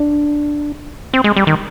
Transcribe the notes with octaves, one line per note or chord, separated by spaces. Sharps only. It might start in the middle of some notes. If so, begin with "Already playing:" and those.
Already playing: D4
C4
G#3
G3
D#3